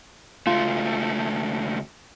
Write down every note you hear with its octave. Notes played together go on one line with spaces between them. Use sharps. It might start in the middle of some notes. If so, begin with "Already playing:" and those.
C#2 A3 F4